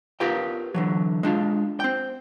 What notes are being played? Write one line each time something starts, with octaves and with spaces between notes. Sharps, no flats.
F4 G4 A#4 B4 G5
D3 E3 F#3
G#3 D4 F4
C4 G5